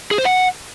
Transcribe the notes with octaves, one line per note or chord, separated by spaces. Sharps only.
G#4
C5
F#5